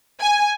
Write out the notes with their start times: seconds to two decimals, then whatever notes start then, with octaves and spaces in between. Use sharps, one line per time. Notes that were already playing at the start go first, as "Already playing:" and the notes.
0.21 G#5